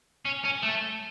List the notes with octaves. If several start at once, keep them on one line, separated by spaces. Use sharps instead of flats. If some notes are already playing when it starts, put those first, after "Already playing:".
C#4
C#4
A3